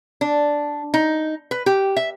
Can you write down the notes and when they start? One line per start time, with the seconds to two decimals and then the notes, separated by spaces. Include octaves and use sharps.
0.21 D4
0.94 D#4
1.51 B4
1.66 G4
1.97 E5